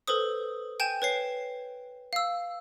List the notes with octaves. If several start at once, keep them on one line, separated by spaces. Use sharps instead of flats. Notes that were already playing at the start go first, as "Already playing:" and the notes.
A4 B4 C5 D#6
G5 G#5 G6 E7
B4 C#5 C7
F5 E6